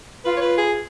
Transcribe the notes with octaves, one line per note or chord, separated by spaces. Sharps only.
F4 B4
C#5
B4
G#4